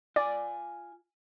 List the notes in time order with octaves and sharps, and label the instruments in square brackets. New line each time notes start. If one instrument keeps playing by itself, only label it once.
[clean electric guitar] F4 G#5 [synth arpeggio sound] D5